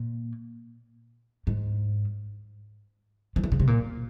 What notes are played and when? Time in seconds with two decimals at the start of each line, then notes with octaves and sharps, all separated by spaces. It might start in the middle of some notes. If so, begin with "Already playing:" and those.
Already playing: A#2
1.47 G#2
3.36 F3
3.44 E3
3.52 C#3
3.60 C3
3.67 A#2